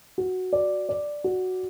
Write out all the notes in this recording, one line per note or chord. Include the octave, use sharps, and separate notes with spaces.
F#4
D5
D5
F#4